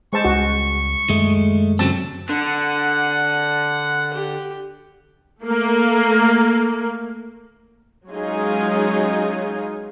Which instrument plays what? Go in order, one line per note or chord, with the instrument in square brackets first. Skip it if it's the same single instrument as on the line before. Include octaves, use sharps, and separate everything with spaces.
[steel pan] G#3 C5 A5 [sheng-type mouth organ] C#6
[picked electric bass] C#2 G3 C#4 [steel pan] F#4
[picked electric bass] F#2 D#3 [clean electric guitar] G#3 A3
[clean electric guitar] C#3 F#3 C4 [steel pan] A5
[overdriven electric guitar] D3 [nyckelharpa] F#5
[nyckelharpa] G4
[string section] A3 A#3
[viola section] F#3 G#3 C#4 D#4 F4 G#4